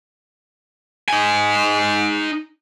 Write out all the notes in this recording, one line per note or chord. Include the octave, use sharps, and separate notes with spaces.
D#4 G#5